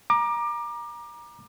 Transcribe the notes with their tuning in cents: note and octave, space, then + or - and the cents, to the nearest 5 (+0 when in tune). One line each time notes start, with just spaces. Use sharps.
A#5 +25 D6 +25